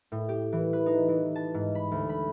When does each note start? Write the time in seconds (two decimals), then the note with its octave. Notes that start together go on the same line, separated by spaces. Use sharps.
0.12 A2
0.29 G4
0.53 E3
0.73 B4
0.86 D#4
1.09 E3
1.36 A5
1.54 G#2
1.75 B5
1.91 D2
2.09 B5